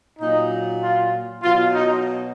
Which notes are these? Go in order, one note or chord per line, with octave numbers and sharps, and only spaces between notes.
A#2 F#3 D#4
F4
B2 F#3 F4
D#4